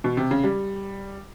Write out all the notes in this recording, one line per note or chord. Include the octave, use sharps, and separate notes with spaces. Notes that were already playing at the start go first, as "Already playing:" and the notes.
B2
C3
C#3
G3